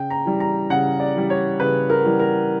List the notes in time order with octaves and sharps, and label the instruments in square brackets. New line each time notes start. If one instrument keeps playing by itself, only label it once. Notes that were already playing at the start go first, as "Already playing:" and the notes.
Already playing: [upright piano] C#3 G5
A#5
E3 G3
A#5
C#3 F#5
D5
E3 G3
C#5
C#3 B4
A#4
E3 G3
A#4